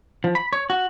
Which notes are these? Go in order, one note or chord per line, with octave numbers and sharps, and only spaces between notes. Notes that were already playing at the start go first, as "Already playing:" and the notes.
F3
B5
C#5
F#4